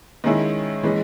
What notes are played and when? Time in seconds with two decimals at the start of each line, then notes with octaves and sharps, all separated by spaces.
0.24 D#3 G#3 C#4 E4 G#4
0.83 E3 G#3 C#4